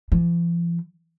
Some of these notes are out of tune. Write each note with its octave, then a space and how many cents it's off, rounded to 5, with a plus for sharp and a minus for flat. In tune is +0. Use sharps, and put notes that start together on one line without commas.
F3 -45